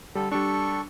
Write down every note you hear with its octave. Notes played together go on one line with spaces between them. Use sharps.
D3 G3 A4
G3 D4 A4 C#6